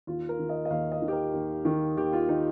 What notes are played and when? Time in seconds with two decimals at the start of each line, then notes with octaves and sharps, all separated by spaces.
0.07 D#2 F4
0.29 A#4
0.39 D#3
0.49 D#5
0.65 D#5
0.70 D#2 F5
0.92 D#5
1.02 D#3
1.08 G4
1.12 A#4
1.33 D#2
1.65 D#3
1.97 D#2 G4
2.13 F4
2.29 D#3 D#4